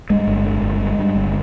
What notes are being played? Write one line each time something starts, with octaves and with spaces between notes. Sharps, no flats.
G2 G#3
G1
D3
G1
G2
G2
G1